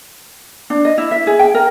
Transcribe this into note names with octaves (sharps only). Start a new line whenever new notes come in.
D4
D#5
E4
E5
G#4
G5
A#4